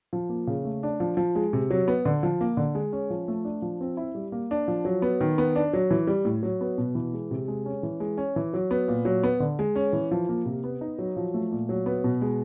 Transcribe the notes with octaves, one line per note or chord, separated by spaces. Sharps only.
F3
A#3
C#3
A3
D4
F3
F3
G#3
C3
F#3
B3
D3
F3
A#3
D3
G#3
C#4
F3
A3
D4
F3
C4
E4
G3
A#3
D4
F3
F#3
B3
D#3
B3
D4
F#3
E3
G3
A2
F#3
B3
B2
E3
G#3
C3
G#3
C#4
E3
G#3
C#4
E3
F#3
B3
A#2
F#3
B3
D3
G#3
C#4
E3
F3
A#3
C3
B3
D#4
F#3
F3
A3
A#2
F#3
B3
B2
G#3